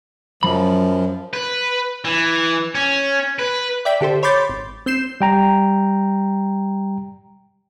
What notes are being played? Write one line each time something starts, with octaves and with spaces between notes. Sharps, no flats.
F#2 F3 F#3 B5
B4
E3
C#4
B4
D5 E5 G5 B6
D3 G4 A4 C5
C#5 B5 C6 D6 G6 A6
G#1
C4 G6 C7 E7
G3 G5 A#5